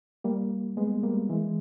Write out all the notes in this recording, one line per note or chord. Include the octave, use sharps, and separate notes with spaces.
G3 A#3
G#3 B3
G3 A#3
E3 G#3